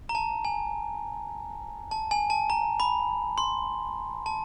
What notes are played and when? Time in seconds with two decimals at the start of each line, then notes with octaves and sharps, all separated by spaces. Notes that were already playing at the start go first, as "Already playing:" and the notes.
0.09 A#5
0.15 A5
0.45 G#5
1.91 A5
2.11 G#5
2.30 A5
2.50 A#5
2.80 B5
3.38 C6
4.26 A5